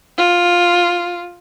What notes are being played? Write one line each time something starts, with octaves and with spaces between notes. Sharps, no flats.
F4